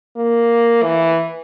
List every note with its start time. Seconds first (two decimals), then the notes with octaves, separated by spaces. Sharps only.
0.16 A#3
0.83 E3